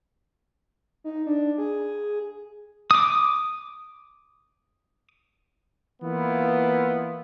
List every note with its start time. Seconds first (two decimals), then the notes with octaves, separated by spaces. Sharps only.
1.04 D#4
1.27 D4
1.58 G#4
2.91 D6 D#6
6.02 E3 A#3 B3 E4 F4